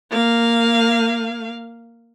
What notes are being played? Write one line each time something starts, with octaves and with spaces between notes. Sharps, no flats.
A#3 F5